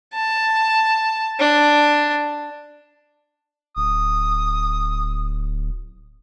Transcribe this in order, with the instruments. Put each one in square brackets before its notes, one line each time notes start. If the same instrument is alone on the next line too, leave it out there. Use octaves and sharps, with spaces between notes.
[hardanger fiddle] A5
D4
[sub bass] D1 [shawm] D#6